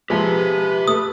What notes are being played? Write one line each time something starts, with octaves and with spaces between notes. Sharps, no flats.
F3 G#3 G4 B4 E5
A3 D#6